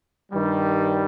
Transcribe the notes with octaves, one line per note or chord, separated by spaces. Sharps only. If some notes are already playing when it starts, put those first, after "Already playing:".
G2 D#3 G3